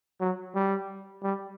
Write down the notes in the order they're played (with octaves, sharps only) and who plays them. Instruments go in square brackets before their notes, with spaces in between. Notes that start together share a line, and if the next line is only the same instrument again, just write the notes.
[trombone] F#3
G3
G3